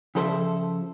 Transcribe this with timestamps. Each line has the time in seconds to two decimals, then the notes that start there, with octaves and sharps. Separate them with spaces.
0.15 C#3 F3 A4 C5 D5 E5